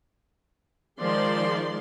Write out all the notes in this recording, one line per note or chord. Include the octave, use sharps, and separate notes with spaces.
D#3 F3 G#3 D5 C6